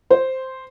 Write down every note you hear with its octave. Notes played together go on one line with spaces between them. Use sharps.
C5